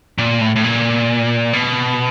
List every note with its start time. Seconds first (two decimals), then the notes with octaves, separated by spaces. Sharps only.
0.18 A#2
0.41 A2
0.56 A2
0.64 A#2
1.53 B2